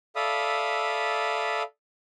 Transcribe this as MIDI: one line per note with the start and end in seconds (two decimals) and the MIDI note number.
0.16 1.63 69
0.16 1.63 74
0.16 1.63 76
0.16 1.63 77
0.16 1.63 83
0.16 1.63 87